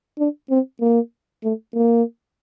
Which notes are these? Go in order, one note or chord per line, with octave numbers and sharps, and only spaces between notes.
D4
C4
A#3
A3
A#3